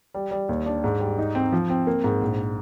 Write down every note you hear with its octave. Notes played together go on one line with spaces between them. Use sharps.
G3
G3
D#2
D4
G#2
G3
D#4
C4
F3
C4
A#3
G#2
A#1